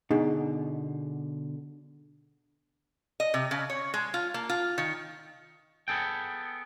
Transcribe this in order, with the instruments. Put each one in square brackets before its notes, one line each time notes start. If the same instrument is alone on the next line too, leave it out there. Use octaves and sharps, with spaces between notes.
[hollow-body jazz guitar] B2 D3 [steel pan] D#4 G#4
[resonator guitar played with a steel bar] D#5
C3
C#3
C#5
G#3
F4
A#3
F4
D#3
[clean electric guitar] B3 G#4 A4 G5